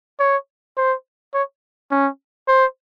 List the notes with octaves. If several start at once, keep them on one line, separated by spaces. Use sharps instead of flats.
C#5
C5
C#5
C#4
C5